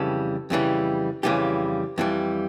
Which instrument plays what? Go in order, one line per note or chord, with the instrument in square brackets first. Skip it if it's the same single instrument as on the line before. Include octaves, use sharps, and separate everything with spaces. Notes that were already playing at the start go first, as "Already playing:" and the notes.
Already playing: [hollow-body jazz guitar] F2 C#3 E3 G3 A4
F2 C#3 E3 G3
F2 C#3 E3 G3 G4
F2 E3 G3